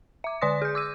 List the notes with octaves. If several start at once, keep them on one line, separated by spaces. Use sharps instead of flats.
E5 D6
D3 D5 C6 D#6 A#6
G#4 G6
D6 E6 D#7